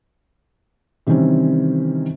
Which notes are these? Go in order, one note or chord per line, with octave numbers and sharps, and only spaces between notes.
C3 D#3 E3 G3 C4 C#4